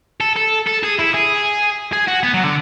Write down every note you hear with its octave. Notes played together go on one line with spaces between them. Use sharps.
A4
A4
A4
G#4
E4
G#4
G#4
F#4
B3
F#3
D3